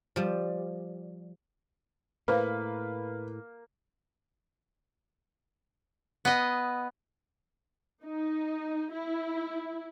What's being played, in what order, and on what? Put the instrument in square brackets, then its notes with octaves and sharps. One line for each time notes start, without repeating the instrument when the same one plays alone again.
[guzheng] F3 G3
[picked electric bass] A2 [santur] A#3 [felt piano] B4 [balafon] C5 F5
[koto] B3 D#5
[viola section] D#4
E4